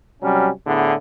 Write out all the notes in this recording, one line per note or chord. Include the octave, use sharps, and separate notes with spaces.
C3 F#3 G3 C#4
A2 D3 B3 D4 E4 G#4